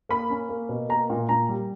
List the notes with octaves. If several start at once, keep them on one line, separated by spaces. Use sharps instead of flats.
A#3 B5
C#4
A#3
B2
A#3 A#5
A#2
A#2 A#5
G3